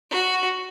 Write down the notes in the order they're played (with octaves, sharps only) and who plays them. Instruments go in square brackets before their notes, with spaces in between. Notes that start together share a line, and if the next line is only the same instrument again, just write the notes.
[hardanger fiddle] F#4